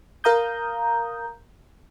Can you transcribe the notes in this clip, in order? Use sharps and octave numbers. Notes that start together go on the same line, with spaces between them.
A#4 F5 A#5 D#6 G6